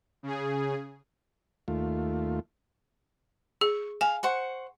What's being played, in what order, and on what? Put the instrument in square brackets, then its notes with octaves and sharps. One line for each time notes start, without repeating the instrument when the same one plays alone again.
[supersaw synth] C#3 G#4
[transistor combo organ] D#2 A3 F4
[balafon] G#4 [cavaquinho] C#6
[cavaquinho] F5 [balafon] G#5
[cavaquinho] C5 F#5 C#6